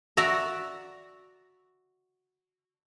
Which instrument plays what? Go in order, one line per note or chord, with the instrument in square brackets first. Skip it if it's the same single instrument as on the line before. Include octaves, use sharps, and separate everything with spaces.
[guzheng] F#4 D5 E5 A#5